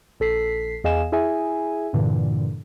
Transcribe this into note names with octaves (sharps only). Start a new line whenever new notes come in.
A#1 A4 B6 C7
E2 G#4 D#5 F5 G#5 E7
E4 G#4 E5 G#5
G2 A#2 D3 E3